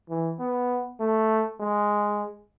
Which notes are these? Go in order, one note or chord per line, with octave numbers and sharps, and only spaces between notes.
E3
B3
A3
G#3